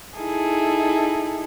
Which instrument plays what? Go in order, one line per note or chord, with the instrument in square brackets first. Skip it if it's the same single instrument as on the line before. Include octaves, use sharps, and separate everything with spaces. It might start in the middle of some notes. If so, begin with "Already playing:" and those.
[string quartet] D#4 E4 G#4 A4